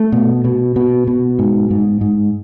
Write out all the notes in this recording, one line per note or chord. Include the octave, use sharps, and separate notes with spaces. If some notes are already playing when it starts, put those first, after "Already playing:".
Already playing: A3
B2
B2
B2
B2
G#2
G#2
G#2